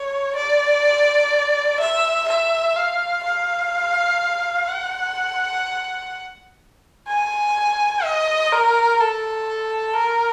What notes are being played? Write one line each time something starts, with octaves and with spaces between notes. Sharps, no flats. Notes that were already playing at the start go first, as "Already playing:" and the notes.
Already playing: C#5
D5
E5
E5
F5
F5
F#5
G#5
D#5
A#4
A4
A#4